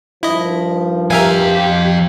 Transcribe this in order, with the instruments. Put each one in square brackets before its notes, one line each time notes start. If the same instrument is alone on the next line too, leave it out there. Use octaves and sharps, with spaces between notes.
[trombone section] G2 D#3 F3 [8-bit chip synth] E4 D#5
[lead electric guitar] F2 F5 [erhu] G4 [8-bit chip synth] A#4 E5 G#5